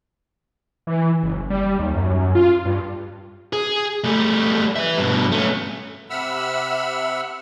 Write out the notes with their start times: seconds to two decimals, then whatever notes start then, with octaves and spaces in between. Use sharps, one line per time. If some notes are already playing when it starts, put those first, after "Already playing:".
0.87 E3
1.23 F#1
1.50 G3
1.79 D#2
1.94 F#2
2.35 F4
2.66 G2
3.53 G#4
4.04 G3 A3
4.76 B4 E5
4.98 G2 B2
5.32 A3 C#4
6.10 C3 E5 F#5 B5 E6 F6